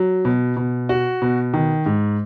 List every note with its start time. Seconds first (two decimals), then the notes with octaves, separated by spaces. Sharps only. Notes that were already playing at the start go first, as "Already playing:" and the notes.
Already playing: F#3
0.25 B2
0.57 B2
0.89 F#4
1.22 B2
1.54 D#3
1.86 G#2